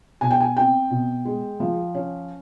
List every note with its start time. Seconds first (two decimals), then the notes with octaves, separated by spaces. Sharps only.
0.21 B2 G#5
0.31 G5
0.40 G#5
0.56 C4 G5
0.91 B2
1.25 G#3
1.60 F3
1.95 C#4